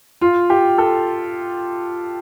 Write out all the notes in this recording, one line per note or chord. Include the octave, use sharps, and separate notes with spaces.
F4
G4
A4